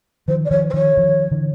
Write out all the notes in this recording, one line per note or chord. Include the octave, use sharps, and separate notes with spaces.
D#3 F3 C5
D5
D#3 F3 C#5
C5
D#3 F3 C#5
D#3 F3
D3 E3